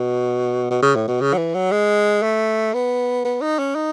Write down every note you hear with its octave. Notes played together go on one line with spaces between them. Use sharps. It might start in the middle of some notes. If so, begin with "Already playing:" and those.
Already playing: B2
B2
C#3
A2
B2
C#3
F#3
E3
F#3
G#3
A3
B3
B3
D#4
C#4
D#4